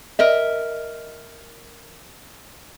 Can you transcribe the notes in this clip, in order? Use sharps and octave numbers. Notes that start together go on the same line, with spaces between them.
A#4 D#5 E5